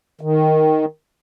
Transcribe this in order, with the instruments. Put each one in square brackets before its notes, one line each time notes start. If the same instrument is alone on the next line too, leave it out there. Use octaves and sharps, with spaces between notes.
[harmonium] D#3